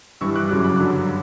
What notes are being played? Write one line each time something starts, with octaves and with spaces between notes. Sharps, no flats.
G2 E3 G3 C#6 E6
D6 F#6
F#2 C#3 F#3 D6 F#6
B5 D6
G2 D3 F#3